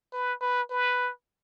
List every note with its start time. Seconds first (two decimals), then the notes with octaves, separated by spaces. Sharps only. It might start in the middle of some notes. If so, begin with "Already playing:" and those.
0.13 B4
0.41 B4
0.70 B4